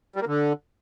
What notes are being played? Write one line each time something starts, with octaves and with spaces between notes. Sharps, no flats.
G3
A#3
D3